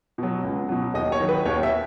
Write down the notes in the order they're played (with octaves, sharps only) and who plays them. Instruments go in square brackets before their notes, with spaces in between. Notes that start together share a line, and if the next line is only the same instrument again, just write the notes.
[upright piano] B2 F#3
C#2
B2 F#3
D#2 D#5
C#5
D#3 F#3
B4
D#2 C#5
E5